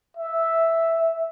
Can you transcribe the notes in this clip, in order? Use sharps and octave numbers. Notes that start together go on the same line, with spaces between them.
E5